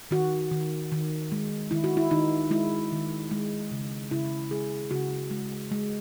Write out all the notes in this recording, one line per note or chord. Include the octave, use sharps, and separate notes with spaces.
D#3 F#4
D#3
D#3
G#3
D#3 E4
F#4
E4
D#3 D#4
G#3 E4
D#3
G#3
C#3
C#3 E4
G#3 G#4
C#3 F#4
G#3
G#3